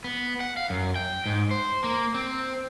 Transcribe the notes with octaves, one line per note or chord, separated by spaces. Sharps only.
B3
F#5
F5
F#2
G5
G#2
C5
A#3
C4